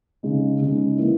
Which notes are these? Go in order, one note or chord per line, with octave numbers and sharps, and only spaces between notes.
C#3 G#3 D#4
C#3 G#3 D#4
E3 A#3 E4